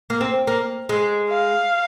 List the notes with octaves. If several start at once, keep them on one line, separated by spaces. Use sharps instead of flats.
A#3
C4
A#3
G#3
F5